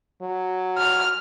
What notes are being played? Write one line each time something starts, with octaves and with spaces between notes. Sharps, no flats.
F#3
F6